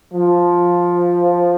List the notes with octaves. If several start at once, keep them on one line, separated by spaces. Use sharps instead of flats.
F3